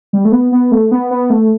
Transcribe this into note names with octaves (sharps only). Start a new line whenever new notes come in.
G3
A3
B3
B3
A3
B3
B3
A3